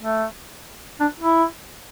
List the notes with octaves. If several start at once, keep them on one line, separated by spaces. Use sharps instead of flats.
A3
D4
E4